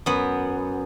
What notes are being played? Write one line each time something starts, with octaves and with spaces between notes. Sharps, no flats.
F#2 B3